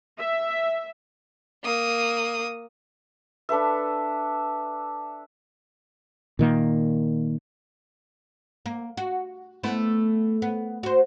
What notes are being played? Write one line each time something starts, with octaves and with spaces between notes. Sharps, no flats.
E5
A#3 D#6
D4 A4 B4 E5
A#2 D#3 A#3
A#3
F#4
A3 B3 E4
B3
F#4 C5